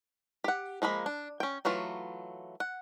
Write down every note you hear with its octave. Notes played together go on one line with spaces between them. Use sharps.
G4 F#5
F3 G#3 A#3 B5
D4
C#4 G5
E3 F#3 A3 F4
F#5